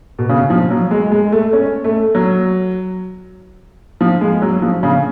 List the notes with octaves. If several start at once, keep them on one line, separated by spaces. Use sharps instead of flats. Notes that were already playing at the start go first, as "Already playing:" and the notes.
B2
C#3
F3
F#3
G#3
G#3
A3
C#4
A3
F#3
F3
G#3
F#3
F3
C#3